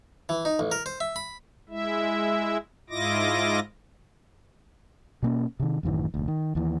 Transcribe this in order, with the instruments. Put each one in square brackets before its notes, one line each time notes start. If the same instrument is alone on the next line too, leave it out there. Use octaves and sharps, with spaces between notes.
[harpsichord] E3
D#4
A1
A#4
C5
E5
B5
[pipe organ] G#3 E4 E5
G#2 E4 F4 D#5 D6 A#6
[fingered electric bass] B2 A#3 C#4
C3 D#3
A1 F#2 D#3 E3
F1 D2
D#3
D#2 E3